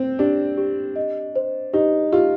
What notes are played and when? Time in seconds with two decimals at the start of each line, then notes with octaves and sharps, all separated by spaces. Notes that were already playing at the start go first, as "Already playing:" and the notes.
Already playing: C4 C5
0.19 D4 G4
0.58 G4
0.96 D#5
1.36 C5
1.73 D#4 G4
2.12 F4 G4